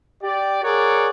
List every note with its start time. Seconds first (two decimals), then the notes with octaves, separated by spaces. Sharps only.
0.23 G4 D5
0.63 G#4 A#4 C#5 D5 F#5